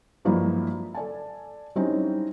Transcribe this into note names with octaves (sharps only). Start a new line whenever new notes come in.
G2 F3 F#3 G#3 A#3 E4
A4 D5 G#5 A5
F#3 G3 C4 C#4 D#4 E4